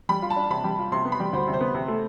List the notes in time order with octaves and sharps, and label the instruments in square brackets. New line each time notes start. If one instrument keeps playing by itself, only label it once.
[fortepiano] G3 [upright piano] B5
[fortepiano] F4
[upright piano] A5
[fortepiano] D4
[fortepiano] C3 [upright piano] B5
[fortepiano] G3
F4
[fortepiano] C3 [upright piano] C6
[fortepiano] B3
[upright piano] B5
[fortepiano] G3
[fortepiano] D2 [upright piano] C5
[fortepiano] C3
[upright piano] C5
[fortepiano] B3
C3
A3